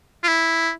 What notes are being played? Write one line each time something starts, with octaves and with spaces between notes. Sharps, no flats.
F4
E4